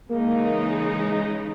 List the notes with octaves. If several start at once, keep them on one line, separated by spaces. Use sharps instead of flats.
C#3 E3 G#3 A#3 D#4